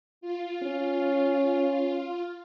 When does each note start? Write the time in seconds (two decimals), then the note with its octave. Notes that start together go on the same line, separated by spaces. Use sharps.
0.21 F4
0.63 C#4